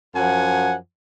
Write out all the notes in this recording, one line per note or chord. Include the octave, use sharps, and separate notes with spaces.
F#2 F3 F#5 G#5